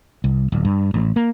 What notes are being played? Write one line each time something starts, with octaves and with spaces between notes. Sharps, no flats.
C2
D1
G2
A1
A#3